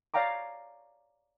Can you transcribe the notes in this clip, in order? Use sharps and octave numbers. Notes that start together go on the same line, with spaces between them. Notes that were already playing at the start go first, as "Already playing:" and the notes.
C#5 D5 F5 G5 A#5 D6